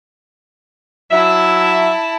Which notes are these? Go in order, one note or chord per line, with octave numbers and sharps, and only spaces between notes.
F#3 E4 E5 A5